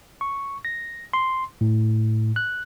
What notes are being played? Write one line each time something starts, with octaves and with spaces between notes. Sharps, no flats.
C#6
A#6
C6
A2
F#6